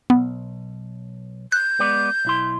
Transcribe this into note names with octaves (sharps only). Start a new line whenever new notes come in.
B1 B3
F#6 G6
G#3 B3 D5
B1 E4 C6